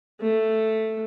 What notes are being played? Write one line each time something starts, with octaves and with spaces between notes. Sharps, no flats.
A3